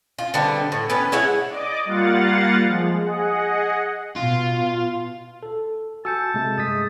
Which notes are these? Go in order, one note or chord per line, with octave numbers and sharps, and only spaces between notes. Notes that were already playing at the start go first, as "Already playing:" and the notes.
F4
D3 G3 B3 C4
A2
B3 C#4 B4
G#3 E4 C#5 F#5
D5 D#5 D6
G3 A#3 F4 F5 F#5 A6
F3 G#3
G#4 D#5 F#5
B2 F4
A4
F#4 G#5 A5 E6 G6 C#7
C3 G#3 A3
G2 G#3 D#6 A6 B6